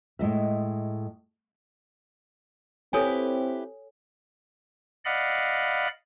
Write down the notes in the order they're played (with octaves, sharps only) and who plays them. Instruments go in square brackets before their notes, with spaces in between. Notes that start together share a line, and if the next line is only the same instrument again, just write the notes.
[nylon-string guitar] A2 G#3 D#5 E5
[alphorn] C4 [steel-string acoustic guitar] E4 G4 B4 [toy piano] A4 C#5 G#5
[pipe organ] D5 D#5 F5 F#5 B5